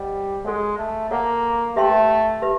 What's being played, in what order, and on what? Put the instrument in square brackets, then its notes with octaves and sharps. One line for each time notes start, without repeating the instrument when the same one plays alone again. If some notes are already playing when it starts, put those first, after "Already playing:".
Already playing: [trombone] G3 [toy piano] C5 D#5 F#5
[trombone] G#3 [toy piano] F#4 A4 C#5 F#5
[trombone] A3
[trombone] A#3 [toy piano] F#4 A4 C#5 F#5
[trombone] A3 [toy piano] G4 B4 E5 G5 C6
[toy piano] G4 B4 E5